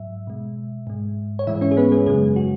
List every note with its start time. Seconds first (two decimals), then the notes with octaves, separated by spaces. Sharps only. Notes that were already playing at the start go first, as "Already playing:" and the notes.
Already playing: G#2 F#3 E5
0.27 B2 G#3
0.87 G#2 G#3
1.39 C#5
1.47 G#2 E3 G#3 E4 E5
1.61 C#4 C#5
1.71 G#4
1.77 B3 B4
1.92 G#3 G#4
2.06 F#2 C#3 F#3 G#3 G#4
2.36 F#4